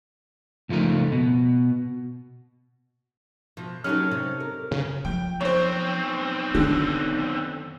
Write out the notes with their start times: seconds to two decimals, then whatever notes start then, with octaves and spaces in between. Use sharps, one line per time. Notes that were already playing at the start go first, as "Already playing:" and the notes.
0.69 C#2 F3 A3 D#4 A#4
1.12 B2
3.57 B2 F3
3.84 F#3 A#3 C#4 D#4 G4 A4 F6
4.11 C3
4.40 A#4
4.71 C#3
5.05 F3 G5
5.41 B1 C4 C5 C#5
6.55 F#2 D3 D#3